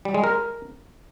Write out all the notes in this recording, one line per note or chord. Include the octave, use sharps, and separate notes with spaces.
G3
G#3
A#4